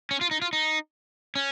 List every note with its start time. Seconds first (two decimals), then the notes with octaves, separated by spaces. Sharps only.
0.11 C#4
0.21 F4
0.31 D#4
0.42 F4
0.53 D#4
1.35 C#4